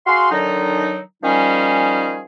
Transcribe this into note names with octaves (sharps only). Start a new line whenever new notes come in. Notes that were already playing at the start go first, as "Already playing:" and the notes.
F#4 G#4 F5 C6
D3 D#3 F#3 D4 D#4
D#3 F3 G3 C#4 D#4 G#4